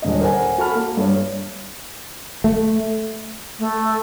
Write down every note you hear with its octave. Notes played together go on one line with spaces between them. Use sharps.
D#1 D3 D#5
A#4 C5 F#5 G#5
F#4 A4 A5 B5 F6
A#3
G2 C#5
A3
A3